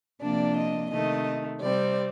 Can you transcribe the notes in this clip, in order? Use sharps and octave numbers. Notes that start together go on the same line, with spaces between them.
C3 F3 A#3 D4 D5
D#5
C3 D#3 A3 D#5
C3 G3 C4 D5